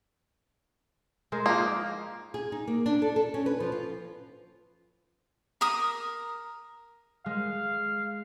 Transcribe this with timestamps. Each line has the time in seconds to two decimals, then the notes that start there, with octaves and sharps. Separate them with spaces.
1.32 G#3 A#4 C5
1.46 F3 A#3 D#4
2.34 G#4
2.52 D#4
2.68 A#3
2.86 D4
3.02 A4
3.16 A4
3.34 C#4
3.46 B4
3.60 F3
3.72 F4
5.61 A#4 D#6
7.26 G#3 F5